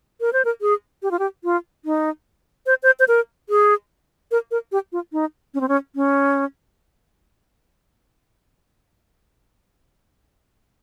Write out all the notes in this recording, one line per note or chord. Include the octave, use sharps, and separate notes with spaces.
A#4
C5
A#4
G#4
G4
F4
G4
F4
D#4
C5
C5
C5
A#4
G#4
A#4
A#4
G4
F4
D#4
C#4
C4
C#4
C#4